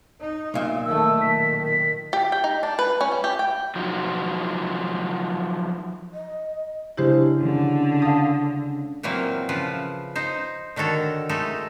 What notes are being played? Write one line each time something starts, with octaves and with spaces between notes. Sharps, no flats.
D#4
B1 A#2 E5
D#3 A3 E6
D#3 B6
B6
G4
G5
D#4
D4
B4
C#4
G3
G4
G5
F3 F#3 D#4 F4 F#4
D#5
C#3 G#3 D4 E4 G4 C5
D3 C#4
F5 A5 D#6
A#2 E3 F#3 A#3 C4
C#3 F3 B4
D#4 C5
D3 D#3 F#4 A4 C#5
G#3 A3 D#4 A4 E5